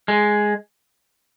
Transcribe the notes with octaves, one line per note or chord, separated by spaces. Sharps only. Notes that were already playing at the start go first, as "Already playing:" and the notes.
G#3